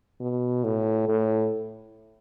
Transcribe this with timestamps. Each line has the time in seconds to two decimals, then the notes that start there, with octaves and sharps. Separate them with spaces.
0.21 B2
0.64 A2
1.09 A2